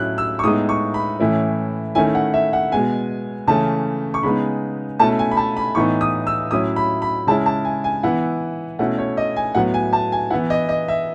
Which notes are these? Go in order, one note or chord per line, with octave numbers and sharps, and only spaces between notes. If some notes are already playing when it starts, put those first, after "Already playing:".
Already playing: A2 F#3 A3 C#4 E4 F#6
E6
C#6
A2 G#3 B3 D#4 D#6
C#6
B5
A2 E3 A3 C#4 E4
D#3 A3 C#4 E4 G#5
F#5
E5
F#5
B2 G#3 B3 G#5
C#3 E3 A3 C#4 A5
C#6
C#3 G#3 B3 D#4 B5
B2 A3 C#4 E4 A5
G#5
B5
A5
B5
A2 E3 B3 D#4 C#6
D#6
E6
A2 F#3 C#4 E4 D#6
B5
B5
C#3 G#3 C#4 E4 A5
A5
G#5
G#5
E3 B3 E4 F#5
B2 A3 C#4 E4 F#5
C#5
D#5
G#5
A2 F#3 B3 F#5
G#5
A5
G#5
E3 B3 E4 F#5
D#5
D#5
E5